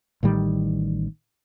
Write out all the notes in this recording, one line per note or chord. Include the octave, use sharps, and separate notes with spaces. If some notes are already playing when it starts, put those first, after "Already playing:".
A1 A2 D#3 G3